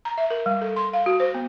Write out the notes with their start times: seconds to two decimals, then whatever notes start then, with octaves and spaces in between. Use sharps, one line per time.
0.05 A#5
0.18 E5
0.30 A#4
0.46 G3
0.61 A4
0.76 C6
0.93 F5
1.06 F#4
1.20 C5
1.35 B3